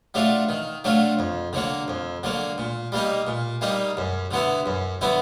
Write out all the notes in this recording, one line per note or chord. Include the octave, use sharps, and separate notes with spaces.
F#3 A3 D4 F4
D#3
F#3 A3 D4 F4
F2
D3 F#3 A#3
F2
D3 F#3 A#3
A#2
G3 A#3 D#4
A#2
G3 A#3 D#4
F#2
D3 F#3 B3 E4
F#2
D3 F#3 B3 E4